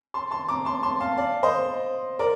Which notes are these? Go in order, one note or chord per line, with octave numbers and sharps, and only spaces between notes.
A5 C6
A5 C6
A#5 D6
A5 C6
A5 C6
F5 A5
D5 F5
C5 D#5
A#4 D5